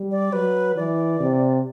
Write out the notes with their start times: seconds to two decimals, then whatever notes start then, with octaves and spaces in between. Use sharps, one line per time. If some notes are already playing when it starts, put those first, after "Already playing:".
Already playing: G3
0.11 D5
0.33 F#3 B4
0.76 E3 D5
1.20 C3